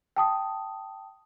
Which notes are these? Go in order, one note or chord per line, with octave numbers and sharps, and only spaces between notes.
G5 A5 D#6